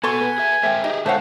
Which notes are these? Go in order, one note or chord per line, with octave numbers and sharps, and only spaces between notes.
B3 F#4 A4 G#5 C6 C#6
B4
G#4 E5
G#3 A#4 C5 E5 G5
D#4 G4 G#4
B2 D3 G#3 A3 C5 C#5 F5 F#5